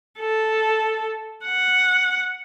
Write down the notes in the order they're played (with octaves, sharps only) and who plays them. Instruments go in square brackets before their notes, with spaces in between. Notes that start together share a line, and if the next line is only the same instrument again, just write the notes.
[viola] A4
F#5